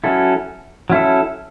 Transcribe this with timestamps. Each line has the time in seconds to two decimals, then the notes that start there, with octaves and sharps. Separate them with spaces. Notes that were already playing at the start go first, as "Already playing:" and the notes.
0.04 F#3 C#4 E4 A4
0.90 F#3 C#4 E4 A4